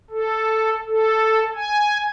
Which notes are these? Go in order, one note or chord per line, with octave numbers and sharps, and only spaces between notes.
A4
A4
G#5